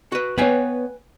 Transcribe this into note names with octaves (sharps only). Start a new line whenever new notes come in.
F#4 B4
B3 B4 C#5 G5 G#5